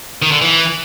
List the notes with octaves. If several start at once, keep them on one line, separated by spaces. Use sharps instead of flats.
D#3
D3
E3